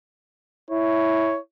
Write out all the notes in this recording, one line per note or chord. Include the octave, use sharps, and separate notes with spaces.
E4 C#5